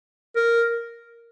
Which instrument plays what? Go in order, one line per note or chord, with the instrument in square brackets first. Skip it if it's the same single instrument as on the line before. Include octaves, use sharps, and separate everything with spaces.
[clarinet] A#4